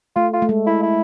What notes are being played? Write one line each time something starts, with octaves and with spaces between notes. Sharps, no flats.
A3 F4
F4
A3
G#3
E4
E4